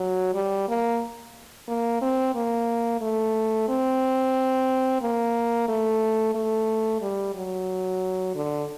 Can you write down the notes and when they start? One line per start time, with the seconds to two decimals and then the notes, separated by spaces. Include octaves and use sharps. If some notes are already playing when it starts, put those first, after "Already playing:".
Already playing: F#3
0.34 G3
0.68 A#3
1.68 A#3
2.01 C4
2.35 A#3
3.01 A3
3.69 C4
5.02 A#3
5.68 A3
6.35 A3
7.02 G3
7.35 F#3
8.35 D3